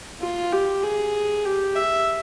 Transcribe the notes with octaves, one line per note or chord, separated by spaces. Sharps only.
F4
G4
G#4
G4
E5